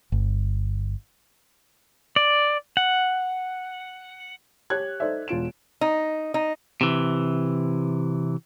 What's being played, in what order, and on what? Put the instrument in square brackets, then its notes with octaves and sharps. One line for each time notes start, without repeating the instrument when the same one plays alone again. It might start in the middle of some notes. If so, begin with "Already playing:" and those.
[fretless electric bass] G1
[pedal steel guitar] D5
F#5
[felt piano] G4 C#5 F#6 G#6
D#4 A4 C5 D5 E5
E1 F4 D7 E7
[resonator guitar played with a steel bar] D#4
D#4
[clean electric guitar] C3 E3